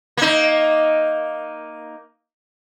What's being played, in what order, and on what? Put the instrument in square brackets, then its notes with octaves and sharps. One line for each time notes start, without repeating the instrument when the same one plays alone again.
[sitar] A#3 D#4